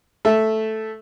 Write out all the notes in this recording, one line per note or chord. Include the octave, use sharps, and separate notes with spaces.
A3 E5